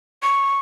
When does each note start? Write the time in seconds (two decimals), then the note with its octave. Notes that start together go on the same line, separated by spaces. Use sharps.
0.23 C#6